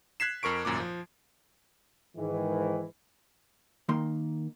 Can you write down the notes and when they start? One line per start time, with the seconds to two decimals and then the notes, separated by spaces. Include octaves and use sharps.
0.20 F#6 G#6 B6 C7 E7
0.43 F2 A#4 C#6 D7
0.65 G#1 F#2 A#2 D6
0.80 F3
2.17 G#2 D#3 E3
3.89 D#3 A#3 C6